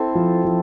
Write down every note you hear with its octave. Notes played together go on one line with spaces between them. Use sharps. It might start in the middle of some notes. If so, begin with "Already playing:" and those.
Already playing: C4 E4 A4 C5
F3
F3